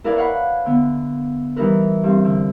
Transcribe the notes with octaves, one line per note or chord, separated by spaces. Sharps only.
E4 A#4 B4 D5 F5 G#5
C#5 F5 F#5 B5
D3 B3
E3 G3 D#4 E4 A#4 B4
G2 C4
D3